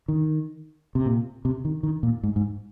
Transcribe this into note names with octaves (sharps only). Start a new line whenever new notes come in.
D#3
C3
A#2
C3
D#3
D#3
A#2
G#2
G#2